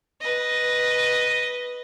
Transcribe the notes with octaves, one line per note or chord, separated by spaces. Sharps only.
B4 D#5